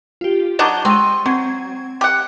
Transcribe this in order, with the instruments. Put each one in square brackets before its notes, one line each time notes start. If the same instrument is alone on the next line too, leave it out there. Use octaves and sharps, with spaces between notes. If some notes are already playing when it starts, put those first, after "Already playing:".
[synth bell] F4 G4
[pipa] F#3 D4 D#4 [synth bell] A6 G7
[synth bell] G#3 C#6 D#7 [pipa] C4
[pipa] F#3 [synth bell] C4 G#6
[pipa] G4 F#5